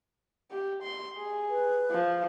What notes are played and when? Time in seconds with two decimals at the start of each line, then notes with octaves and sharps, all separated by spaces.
0.51 G4
0.83 C6
1.17 G#4
1.49 B4
1.91 F3